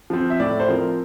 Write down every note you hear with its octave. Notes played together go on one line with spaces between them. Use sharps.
F3 C4
E5
A2 D5
C5
F3 C4 A#4